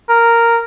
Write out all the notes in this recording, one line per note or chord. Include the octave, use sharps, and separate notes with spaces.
A#4